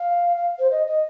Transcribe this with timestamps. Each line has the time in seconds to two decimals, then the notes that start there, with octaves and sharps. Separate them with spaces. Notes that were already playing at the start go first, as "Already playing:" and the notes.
Already playing: F5
0.37 F5
0.59 C5
0.71 D#5
0.87 D#5